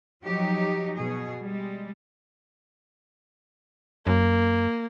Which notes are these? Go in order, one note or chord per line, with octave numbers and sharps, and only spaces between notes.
F3 F#3 D#4 G4
B2 G#4
G3 G#3
F#2 A#3